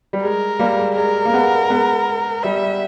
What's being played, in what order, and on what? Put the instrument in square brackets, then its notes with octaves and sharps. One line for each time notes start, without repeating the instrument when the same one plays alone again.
[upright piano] G3
[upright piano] G#3 [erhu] A#4
[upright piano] G3 A#3
G#3
[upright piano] G#3 [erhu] A#4
[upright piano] A#3
G#3 B3
G#3 B3
[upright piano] G3 [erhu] E5